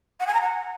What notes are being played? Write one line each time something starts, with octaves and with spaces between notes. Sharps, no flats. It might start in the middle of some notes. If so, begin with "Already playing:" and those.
F#5
G#5
A#5
F#5